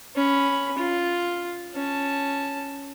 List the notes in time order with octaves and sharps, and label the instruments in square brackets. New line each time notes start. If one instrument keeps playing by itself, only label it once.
[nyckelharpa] C#4 B5
F4
C#4 A5